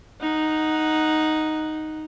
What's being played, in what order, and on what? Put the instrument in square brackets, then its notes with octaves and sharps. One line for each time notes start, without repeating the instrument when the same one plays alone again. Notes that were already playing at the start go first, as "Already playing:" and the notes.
[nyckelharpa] D#4 F#5